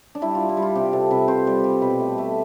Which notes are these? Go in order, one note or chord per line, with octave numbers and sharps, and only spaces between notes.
D4
G3 E4
G3 F4
E4
G3
F4
C3 G4
C3 A4
C3 B4
C3 C5
G3
G3
B2 B4
A3
A3